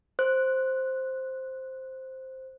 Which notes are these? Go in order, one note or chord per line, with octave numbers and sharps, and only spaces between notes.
C5 F#6